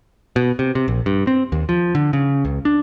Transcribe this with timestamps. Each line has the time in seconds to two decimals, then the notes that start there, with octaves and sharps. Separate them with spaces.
0.36 B2
0.59 C3
0.75 C3
0.88 A#1
1.06 G2
1.27 C4
1.52 D#2
1.69 F3
1.95 D3
2.13 C#3
2.45 C#2
2.65 D4